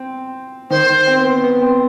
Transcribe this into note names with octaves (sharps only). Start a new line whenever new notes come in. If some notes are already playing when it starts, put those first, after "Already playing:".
Already playing: C4
D#3 C5
C4
B3
B3
C4